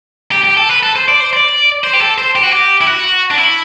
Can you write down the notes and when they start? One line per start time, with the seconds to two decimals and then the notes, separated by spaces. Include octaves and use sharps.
0.32 G4
0.44 G4
0.57 A4
0.69 B4
0.83 A4
0.96 C5
1.08 D5
1.20 C5
1.33 D5
1.84 C5
1.93 G4
2.01 A4
2.18 C5
2.35 G4
2.43 F#4
2.52 G4
2.81 E4
2.87 F#4
3.31 D4
3.38 E4